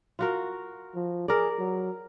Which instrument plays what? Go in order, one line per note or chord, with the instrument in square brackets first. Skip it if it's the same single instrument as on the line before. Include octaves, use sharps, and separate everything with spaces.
[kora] F4 F#4 A#4
[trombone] F3
[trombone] G#4 [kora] A#4 D5
[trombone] F#3